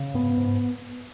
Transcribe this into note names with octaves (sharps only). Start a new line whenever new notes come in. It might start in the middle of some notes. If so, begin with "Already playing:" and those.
Already playing: C#3
G#2 B3
G#2